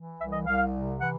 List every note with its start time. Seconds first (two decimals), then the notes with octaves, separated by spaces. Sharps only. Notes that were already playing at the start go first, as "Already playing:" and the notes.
Already playing: E3
0.19 C2 E5
0.32 D#5
0.46 C2 F5
0.73 C3
1.00 E3 F#5